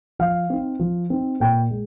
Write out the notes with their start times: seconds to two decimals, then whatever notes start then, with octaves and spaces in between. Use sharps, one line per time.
0.19 F3 F5
0.50 C4 D#4
0.79 F3
1.10 C4 D#4
1.40 A#2 G5
1.71 G#3